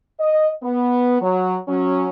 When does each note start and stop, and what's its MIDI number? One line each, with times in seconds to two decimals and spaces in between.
0.20 0.49 75
0.63 1.18 59
1.21 1.57 54
1.68 2.09 54
1.68 2.09 61